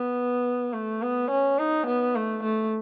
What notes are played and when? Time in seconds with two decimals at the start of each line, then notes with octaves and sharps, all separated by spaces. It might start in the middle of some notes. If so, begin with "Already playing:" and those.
Already playing: B3
0.74 A3
1.03 B3
1.31 C#4
1.59 D#4
1.87 B3
2.16 A3
2.44 A3